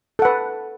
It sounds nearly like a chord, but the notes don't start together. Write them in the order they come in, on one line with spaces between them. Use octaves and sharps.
A4 F#5 B4